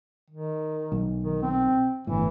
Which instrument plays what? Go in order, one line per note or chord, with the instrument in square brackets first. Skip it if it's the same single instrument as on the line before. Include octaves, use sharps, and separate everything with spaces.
[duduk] D#3
[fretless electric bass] B1
[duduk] D#3
C4
[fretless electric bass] G1 A2 [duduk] E3